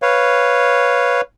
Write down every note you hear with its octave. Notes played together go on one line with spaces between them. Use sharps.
B4 C#5 F5